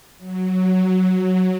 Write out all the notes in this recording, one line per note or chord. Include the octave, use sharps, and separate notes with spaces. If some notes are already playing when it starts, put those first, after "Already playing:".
F#3